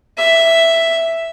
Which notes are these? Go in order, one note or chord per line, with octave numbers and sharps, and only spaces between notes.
E5